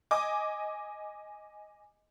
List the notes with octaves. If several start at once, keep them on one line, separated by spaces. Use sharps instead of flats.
D#5 G#5 D6